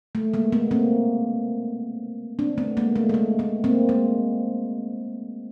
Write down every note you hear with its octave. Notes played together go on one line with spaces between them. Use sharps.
A3
G#3 A#3
A3 B3
A#3 C4
C4 D4
A3 B3
G#3 A#3
A3
G#3
A3
A3 B3
A#3 C4
G#3 A#3